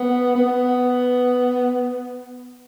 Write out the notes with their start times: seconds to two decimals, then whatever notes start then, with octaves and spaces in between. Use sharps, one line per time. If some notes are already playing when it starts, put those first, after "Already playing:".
Already playing: B3
0.35 B3